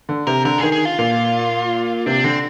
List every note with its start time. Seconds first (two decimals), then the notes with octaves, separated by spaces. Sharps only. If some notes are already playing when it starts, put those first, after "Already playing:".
0.09 D3
0.27 C3 A#4
0.45 D3 A#4
0.59 D#3 G#4
0.72 G#4
0.85 F4
0.99 A#2
2.06 C3 D4
2.24 D3 C4